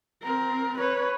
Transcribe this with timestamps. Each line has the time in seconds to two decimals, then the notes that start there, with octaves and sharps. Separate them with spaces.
0.23 C4 A#4
0.78 B4 C#5